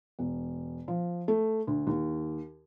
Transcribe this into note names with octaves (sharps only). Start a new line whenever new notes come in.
E1
F3
A3
D2
D#2